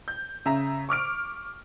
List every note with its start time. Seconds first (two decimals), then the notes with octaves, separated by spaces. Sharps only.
0.08 G6
0.46 C#3 E5 A#5
0.89 C#6 D6 F6 D7